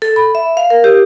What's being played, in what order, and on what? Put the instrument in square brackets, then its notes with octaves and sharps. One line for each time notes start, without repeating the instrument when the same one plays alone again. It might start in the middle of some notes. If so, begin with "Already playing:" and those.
[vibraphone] A4
B5
E5
F5
A#4
G4